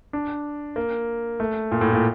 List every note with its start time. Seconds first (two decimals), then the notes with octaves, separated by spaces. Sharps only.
0.13 D4
0.76 A#3
1.40 A3
1.72 A#2
1.81 A2
1.92 A#2